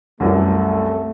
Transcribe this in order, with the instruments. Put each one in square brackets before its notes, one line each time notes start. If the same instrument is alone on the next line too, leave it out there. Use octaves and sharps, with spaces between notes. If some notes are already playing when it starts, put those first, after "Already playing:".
[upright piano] C2 F#2 E3 [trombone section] A3